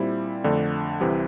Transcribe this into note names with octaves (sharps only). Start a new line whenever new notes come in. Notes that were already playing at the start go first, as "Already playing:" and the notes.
Already playing: A#2 G3 C4 E4
F2 D3 A3 D4
C2 C3 E3